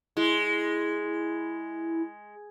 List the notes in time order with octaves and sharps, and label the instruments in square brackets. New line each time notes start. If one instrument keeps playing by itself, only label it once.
[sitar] G#3 [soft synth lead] E4